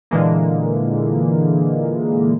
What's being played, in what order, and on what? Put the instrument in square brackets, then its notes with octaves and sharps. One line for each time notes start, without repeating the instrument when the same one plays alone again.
[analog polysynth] A#2 D3 E3 G#3 A#3